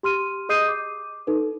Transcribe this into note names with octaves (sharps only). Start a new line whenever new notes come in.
G4 C6 F6 D#7
G#4 D#5 D#6 G6 C7 D#7
D6
D#4 A4 B4